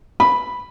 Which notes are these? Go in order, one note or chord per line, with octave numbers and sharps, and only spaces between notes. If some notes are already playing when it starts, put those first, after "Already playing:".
B5